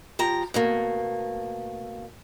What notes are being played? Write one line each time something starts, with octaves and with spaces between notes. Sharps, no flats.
F3 G4 A#5
B2 A3 A#3